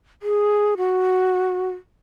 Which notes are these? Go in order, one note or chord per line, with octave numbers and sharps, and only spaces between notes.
G#4
F#4